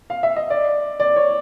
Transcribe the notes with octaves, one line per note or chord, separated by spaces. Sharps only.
F5
E5
D#5
D5
D5
C#5